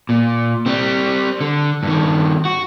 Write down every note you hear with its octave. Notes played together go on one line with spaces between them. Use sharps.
A#2
G3 C4
D3
G2 D#3
F#4